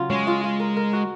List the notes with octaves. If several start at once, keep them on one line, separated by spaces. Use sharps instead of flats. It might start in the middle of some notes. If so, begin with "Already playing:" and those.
Already playing: C#3 F#3 F4
G#3 C#4
F4
F4
A#4
A#4
F#4